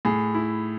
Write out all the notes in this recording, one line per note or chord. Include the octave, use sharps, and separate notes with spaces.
A2 G#4
E4